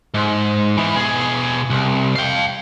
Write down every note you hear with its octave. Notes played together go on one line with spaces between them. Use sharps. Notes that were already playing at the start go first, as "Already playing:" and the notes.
G#2
E3 B3
B2 G#4
C2
F5 G5